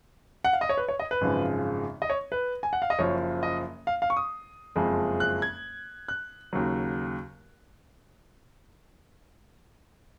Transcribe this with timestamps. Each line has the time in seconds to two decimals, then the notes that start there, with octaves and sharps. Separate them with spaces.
0.44 F#5
0.53 F5
0.61 D#5
0.69 C#5
0.77 B4
0.89 C#5
1.00 D#5
1.11 B4
1.21 G#1 F#2 C#3 F3 G#3
2.02 D#5
2.10 C#5
2.32 B4
2.63 G#5
2.73 F#5
2.82 F5
2.90 D#5
2.99 F#1 F#2 F3 C#5
3.43 D#5
3.87 F5
4.02 F5
4.10 C#6
4.17 D#6
4.76 F#1 F2 F3 G#3
5.20 F#6
5.42 G#6
6.08 F#6
6.53 D#2 C#3 F#3